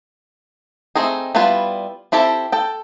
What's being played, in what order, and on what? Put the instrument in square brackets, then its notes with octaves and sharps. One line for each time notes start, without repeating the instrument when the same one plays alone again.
[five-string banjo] A3 C4 D#4 G#4
G3 B3 E4 F4 B4
C4 E4 G4 A4
A4 G5